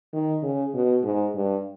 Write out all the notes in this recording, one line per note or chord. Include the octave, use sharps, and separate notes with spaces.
D#3
C#3
B2
G#2
G2